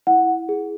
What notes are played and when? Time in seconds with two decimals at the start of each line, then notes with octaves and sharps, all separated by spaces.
0.07 E4 F#5
0.49 G#4